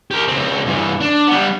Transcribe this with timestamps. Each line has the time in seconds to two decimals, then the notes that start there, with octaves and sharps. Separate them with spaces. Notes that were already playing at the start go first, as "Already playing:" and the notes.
0.11 G4 A#4
0.28 C#2 C4
0.66 G2 E3
1.01 D4
1.27 G3 B3